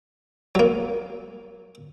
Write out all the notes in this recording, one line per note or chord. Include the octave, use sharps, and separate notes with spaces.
F#3 A#3